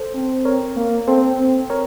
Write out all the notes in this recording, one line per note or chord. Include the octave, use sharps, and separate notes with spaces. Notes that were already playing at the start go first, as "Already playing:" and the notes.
Already playing: A4 C5
C4
A#4 C#5
A#3
C4 A4 C5
C4
A#4 C#5